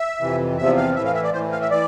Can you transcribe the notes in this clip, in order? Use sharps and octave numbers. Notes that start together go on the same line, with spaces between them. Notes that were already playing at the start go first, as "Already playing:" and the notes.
Already playing: E5
F2 C3 E3
E2 C3 F3 E5
F5
A2 E3 E5
F5
E5
D5
A2 E3 C5
F5
E5
E3 D5